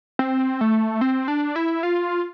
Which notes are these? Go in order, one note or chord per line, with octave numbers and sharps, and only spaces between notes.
C4
A3
C4
D4
E4
F4